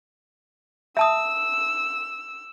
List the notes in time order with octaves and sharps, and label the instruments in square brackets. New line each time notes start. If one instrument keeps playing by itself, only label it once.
[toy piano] E5 A5 D#6 [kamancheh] E6